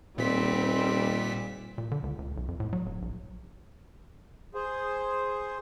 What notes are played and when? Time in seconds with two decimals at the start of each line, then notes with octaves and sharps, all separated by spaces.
0.18 D#1 A#2 G3 C4 B6
1.78 A#2
1.91 D3
2.03 C#2
2.18 C#2
2.37 B1
2.48 F2
2.60 A2
2.73 F#3
2.85 D1
3.02 A#1
4.54 G#4 C5